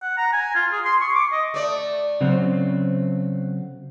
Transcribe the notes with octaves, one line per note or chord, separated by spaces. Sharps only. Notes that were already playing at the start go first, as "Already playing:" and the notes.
F#5
A#5
G#5
F4
G#4
C6
C#6
D6
D#5
A3 D5
C#3 F#3 C4